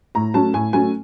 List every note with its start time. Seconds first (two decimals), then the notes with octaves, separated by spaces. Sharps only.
0.15 A2 A#5
0.34 F#3 A3 C#4 A5
0.54 A2 G#5
0.73 F#3 A3 C#4 G#5